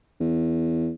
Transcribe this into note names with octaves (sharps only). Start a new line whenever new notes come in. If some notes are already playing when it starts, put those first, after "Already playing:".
E2